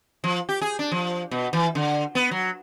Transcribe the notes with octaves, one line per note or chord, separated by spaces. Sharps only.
F3
G4
G#4
D4
F3
B2
E3
D3
B3
F#3